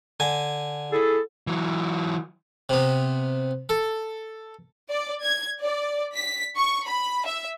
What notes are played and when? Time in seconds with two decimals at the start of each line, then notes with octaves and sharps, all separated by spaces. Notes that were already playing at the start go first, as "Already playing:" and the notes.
0.20 D3 G#5
0.92 E4 G#4 A4
1.47 E3 F#3
2.69 C3 B3
3.69 A4
4.90 D5
5.24 G#6
5.61 D5
6.15 B6
6.58 C#6
6.88 B5
7.26 E5